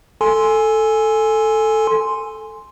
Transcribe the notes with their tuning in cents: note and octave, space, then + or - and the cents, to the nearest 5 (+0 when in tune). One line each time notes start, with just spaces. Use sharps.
A4 +0 G#5 +0 C6 +0